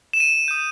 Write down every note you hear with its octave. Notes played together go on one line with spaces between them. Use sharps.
E7
D#7
D#6 G6